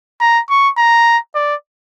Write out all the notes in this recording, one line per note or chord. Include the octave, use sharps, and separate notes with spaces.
A#5
C#6
A#5
D5